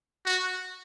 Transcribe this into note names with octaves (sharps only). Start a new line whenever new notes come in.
F#4